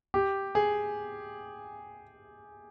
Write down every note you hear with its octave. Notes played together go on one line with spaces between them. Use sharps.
G4
G#4